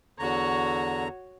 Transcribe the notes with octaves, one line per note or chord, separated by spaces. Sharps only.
E2 D3 F#4 C#5 A#5